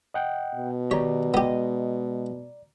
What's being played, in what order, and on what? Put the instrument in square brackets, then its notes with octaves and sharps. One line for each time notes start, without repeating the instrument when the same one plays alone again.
[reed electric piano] D#5 F#5 G5
[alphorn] B2
[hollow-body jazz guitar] D#3 G4 [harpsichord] C#5 [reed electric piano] D5 A#5
[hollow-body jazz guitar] G#3 D#5 [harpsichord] B3 G4